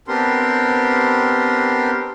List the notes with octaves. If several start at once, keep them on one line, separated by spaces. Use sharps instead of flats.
B3 C4 D4 G4 A#4 C6